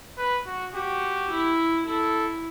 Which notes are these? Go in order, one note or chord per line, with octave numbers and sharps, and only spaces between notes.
B4
F#4
F#4 G4
E4
E4 A4